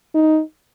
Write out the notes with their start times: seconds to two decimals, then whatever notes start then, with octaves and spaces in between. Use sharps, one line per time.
0.15 D#4